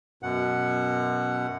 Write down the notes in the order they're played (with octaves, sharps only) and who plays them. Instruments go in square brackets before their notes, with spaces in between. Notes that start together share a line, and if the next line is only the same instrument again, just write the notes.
[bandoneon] F#2 B2 F#5